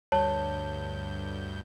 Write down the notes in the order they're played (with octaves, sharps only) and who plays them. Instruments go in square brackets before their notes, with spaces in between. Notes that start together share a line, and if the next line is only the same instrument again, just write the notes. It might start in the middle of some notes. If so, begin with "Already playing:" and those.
[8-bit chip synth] D2 G2 G6 [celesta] C#5 A5